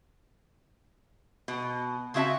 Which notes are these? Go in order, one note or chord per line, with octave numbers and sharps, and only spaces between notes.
B2
C#3 C4 F#4 E5 A5